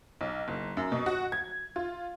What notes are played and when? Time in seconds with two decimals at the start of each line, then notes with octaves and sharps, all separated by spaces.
0.21 B1
0.48 F#1
0.77 F#2
0.92 B2
1.06 F#4
1.32 G#6
1.76 F4